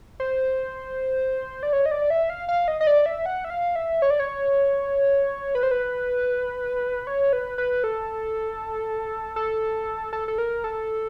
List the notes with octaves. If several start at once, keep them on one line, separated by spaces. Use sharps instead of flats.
C5
D5
C#5
D#5
D5
E5
F5
F5
D#5
D#5
D5
E5
F#5
E5
F5
E5
C#5
D5
C#5
B4
C5
B4
C#5
B4
B4
A4
A4
A4
A4
A#4
A4